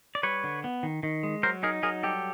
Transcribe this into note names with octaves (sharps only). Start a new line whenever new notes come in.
D5
G3 B4 C#5
D3
B3
D#3
D#3
G#3
F#3 A#4 C5
D#4 G#4 A#4
F#3 G#4 A#4
G3 G4 A4